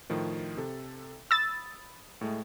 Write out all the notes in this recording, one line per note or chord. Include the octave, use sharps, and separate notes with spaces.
A2 D#3 F3
C3 A4
B5 D#6 E6 A6
A2 G#3 A3